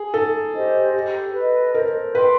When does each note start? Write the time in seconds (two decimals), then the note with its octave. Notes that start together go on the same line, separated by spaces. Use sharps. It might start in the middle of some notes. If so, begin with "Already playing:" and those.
Already playing: G#4
0.14 D#4 A4
0.54 G4 C5 D#5
0.94 G4
1.34 B4 D#5
1.74 A#4 C5
2.15 B4 D#5 G5 C6